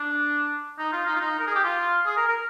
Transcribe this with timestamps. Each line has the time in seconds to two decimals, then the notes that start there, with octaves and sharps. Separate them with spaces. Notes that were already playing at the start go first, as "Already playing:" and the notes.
Already playing: D4
0.79 D#4
0.93 F4
1.06 D#4
1.15 F4
1.20 D#4
1.39 A#4
1.47 G#4
1.55 G4
1.64 F4
2.06 G#4
2.17 A#4
2.28 A#4